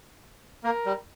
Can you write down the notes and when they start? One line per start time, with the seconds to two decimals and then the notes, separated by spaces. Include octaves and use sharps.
0.64 A#3 A#4
0.86 G3